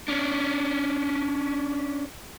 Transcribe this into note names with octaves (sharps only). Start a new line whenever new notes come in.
C#4 D4